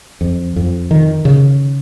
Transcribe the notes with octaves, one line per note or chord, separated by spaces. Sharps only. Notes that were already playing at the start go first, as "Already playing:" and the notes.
F2
F2
D#3
C#3